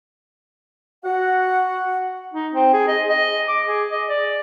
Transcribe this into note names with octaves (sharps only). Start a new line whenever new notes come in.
F#4 F#5
D#4
C4
G#4
D#5
D#5
D6
G#4
D#5
D5